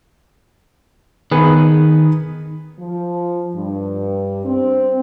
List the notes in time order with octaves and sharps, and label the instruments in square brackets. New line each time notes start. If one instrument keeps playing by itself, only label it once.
[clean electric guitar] D#3 [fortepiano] B3 G#4 B4
[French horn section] F3
G2
C4